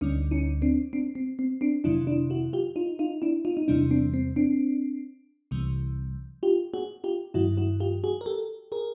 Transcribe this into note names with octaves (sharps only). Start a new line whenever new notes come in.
D2 D3 G3 C#4 D#4
C#4 D#4
C4 D4
C4 D4
C4
C4
C4 D4
F2 C3 D#3 F#3 D4 E4
D4 E4
E4 F#4
F4 G4
D#4 F4
D#4 F4
D4 E4
D#4 F4
D#4
E2 C3 E3 G3 D4 E4
C4 D4
C4
C4 D4
C2 C3 E3 G3
F4 G4
F#4 G#4
F4 G4
G2 D#3 F#3 E4 F#4
E4 F#4
F4 G4
F#4 G#4
A#4
G4 A4
G#4 A#4